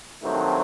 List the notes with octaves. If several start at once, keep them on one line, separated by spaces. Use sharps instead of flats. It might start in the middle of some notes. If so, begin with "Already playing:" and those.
G2 D#3 F#3 A3 C4